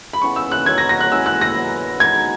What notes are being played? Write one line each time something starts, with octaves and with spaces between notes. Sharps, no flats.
B5
C#3 E3 B3 C#6
E6
F#6
B3 F#4 A#4 C#5 G#6
A#6
A#6
F#6
G#3 C#4 E4 G#4 E6
F#6
A#6
F#3 B3 F#4 C#5
G#3 B3 D#4 G#6